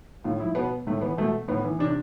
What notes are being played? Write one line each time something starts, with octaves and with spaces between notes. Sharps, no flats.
A2 F4
F3 E4
B2 B3
A2 A3
E3 B3
B2 A3
A2 B3
E3
C3 D4